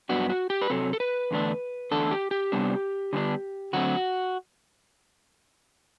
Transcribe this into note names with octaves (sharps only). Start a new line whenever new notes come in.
G2 F#3 B3 D4 F#4
F#4
G4
B4
C3 F#3 C4 A4
A4
B4
E2 D3 A3 D4
E2 D3 A3 D4 A4
G4
G4
C3 G3 B3 D4
D3 G3 B3 D4
D3 F#3 A3 C4 F#4